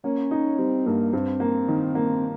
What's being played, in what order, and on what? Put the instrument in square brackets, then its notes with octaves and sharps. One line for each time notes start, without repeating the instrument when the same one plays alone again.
[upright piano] A#3 [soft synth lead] C#4
[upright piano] D#4
[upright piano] G3 [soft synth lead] C4
[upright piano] G2 [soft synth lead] A#3
[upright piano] G2 [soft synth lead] C4
[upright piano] A#3
D#3
A#3